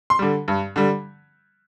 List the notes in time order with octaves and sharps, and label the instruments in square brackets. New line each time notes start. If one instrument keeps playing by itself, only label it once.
[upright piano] C6
D3 G3
G2
D3 G3